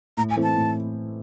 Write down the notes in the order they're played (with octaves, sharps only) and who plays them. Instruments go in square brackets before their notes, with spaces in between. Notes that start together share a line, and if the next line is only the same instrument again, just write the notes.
[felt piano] A2 [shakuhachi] A#5
[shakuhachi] G#5
[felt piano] E3 A3 C4 E4
[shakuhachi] A5
[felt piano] A2